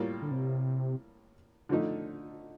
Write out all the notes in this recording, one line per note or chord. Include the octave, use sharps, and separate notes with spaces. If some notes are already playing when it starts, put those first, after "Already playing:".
Already playing: A2 G3 A#3 F4
D3
C3
D3 F3 A3 D#4